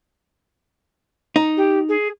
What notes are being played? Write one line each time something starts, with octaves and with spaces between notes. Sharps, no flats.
D#4
G4
G#4